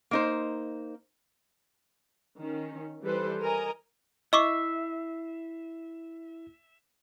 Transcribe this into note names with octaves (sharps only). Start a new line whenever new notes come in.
A#3 D#4 C5
D#3 C#4
E3 G3 G4 A4 B4 C5
A#4 D#5 G#5 A#5
E4 D#5 E5 C#6 D6 C7